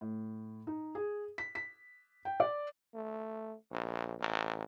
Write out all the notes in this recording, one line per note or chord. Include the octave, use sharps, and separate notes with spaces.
A2
D#4
G#4
B6
B6
G5
D5
A3
A#1
A1